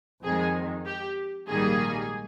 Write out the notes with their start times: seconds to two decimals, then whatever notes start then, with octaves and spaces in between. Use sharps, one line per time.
0.23 F2 D#3 G#3 G#4
0.86 G4
1.48 A#1 G#2 D#3 G3 A#3 G#4